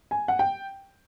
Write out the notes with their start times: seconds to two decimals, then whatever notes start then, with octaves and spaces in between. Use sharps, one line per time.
0.11 G#5
0.28 F#5
0.39 G5